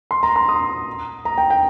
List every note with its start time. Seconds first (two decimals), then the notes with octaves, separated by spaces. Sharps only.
0.11 C6
0.23 A#5
0.36 C6
0.49 D#6
1.25 A#5
1.38 G5
1.50 G5